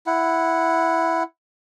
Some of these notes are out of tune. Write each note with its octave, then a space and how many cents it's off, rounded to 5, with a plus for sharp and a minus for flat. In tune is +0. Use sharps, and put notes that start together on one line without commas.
E4 +5 F#5 -5